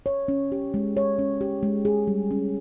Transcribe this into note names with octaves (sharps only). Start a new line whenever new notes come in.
C#5
C#4
G4
G#3
C#5
C#4
G4
G#3
G#4
G3
C#4